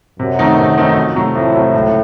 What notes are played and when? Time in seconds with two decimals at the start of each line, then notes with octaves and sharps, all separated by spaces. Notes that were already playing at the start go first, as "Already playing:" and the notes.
0.19 F#2 C3
0.39 D#3 A3 C4 D#4
0.59 C3
0.78 D#3 A3 C4 D#4
0.96 F2
1.16 C3 F#3 A3
1.35 F2 A2
1.54 C3 F#3 A3
1.74 C#2